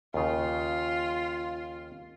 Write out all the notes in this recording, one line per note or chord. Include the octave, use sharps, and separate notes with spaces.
D#2 C#3 F4